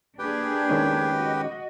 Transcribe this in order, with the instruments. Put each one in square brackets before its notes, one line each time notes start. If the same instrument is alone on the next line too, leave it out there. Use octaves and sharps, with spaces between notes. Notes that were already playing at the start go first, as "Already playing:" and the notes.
[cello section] A#3 D4 G#4 [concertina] G4 B4 G5
[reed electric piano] D#3 G#3 C#4
[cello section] F#4 D#5